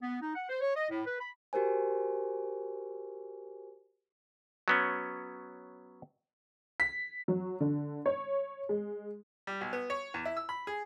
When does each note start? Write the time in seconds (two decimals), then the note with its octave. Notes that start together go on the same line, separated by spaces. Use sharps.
0.01 B3
0.21 D#4
0.34 F#5
0.48 C5
0.61 C#5
0.75 D#5
0.89 A2
1.05 B4
1.19 B5
1.53 F#4 G4 A#4 C5 G#5
4.68 F#3 B3 C#4
6.80 B6
7.28 F#3
7.60 D3
8.06 C#5
8.69 G#3
9.47 G3
9.61 B1
9.73 B3
9.90 C#5
10.14 E2
10.25 E4
10.37 E6
10.49 B5
10.67 G#4